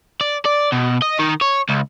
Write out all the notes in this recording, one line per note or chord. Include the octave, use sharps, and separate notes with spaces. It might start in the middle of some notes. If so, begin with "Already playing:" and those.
D5
D5
B2
D#5
D#3
C#5
C#2